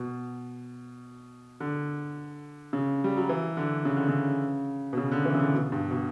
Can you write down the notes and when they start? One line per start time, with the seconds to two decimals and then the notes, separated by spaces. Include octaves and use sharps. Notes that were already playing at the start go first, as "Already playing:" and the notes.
Already playing: B2
1.60 D3
2.73 C#3
3.04 G3
3.17 F#3
3.29 E3
3.57 D3
3.85 C#3
3.97 D3
4.09 C#3
4.93 B2
4.97 C#3
5.12 D3
5.25 E3
5.35 C#3
5.40 D3
5.54 B2
5.72 G2
5.91 B2